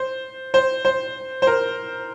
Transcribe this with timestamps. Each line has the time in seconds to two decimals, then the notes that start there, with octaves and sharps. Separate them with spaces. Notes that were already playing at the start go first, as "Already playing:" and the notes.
Already playing: C5
0.54 C5
0.85 C5
1.42 C5
1.47 A#4